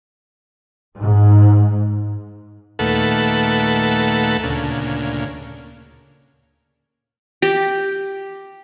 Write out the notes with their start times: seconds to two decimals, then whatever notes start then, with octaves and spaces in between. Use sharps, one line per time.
0.98 G#2
2.79 D#2 A#2 A3 A4 B4 F#5
4.43 D2 A#2 C#3
7.42 G4